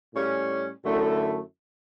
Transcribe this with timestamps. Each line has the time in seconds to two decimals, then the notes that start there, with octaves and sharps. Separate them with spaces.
0.13 A2 G3 C#4
0.82 F#2 D3 A3 E4